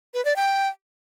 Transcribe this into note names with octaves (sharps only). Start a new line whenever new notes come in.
B4
D5
G5